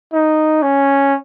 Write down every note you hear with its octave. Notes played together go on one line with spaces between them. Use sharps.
D#4
C#4